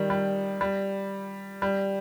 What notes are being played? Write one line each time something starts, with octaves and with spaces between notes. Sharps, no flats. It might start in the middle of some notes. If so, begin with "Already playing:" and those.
Already playing: D#3 G3
G3
G3
G3